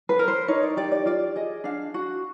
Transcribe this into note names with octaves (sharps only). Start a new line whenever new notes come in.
B4
A#4
C5
D#4 C#5
D5
G4 D5
D5
F4 D5
G#4 D#5
D4 F5
F#4